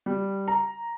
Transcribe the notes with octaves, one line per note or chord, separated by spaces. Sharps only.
G3
A#5